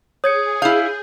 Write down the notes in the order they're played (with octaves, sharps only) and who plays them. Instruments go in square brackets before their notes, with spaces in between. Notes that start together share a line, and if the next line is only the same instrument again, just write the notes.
[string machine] G#4 [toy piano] C#5 [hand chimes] D#6 G#6 C#7
[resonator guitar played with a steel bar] E4 F5 [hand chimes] G6